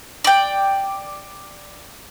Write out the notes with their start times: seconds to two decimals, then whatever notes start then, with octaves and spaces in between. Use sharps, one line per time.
0.24 D5 G5